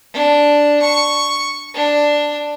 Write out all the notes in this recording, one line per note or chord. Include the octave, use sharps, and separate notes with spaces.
D4
C#6
D4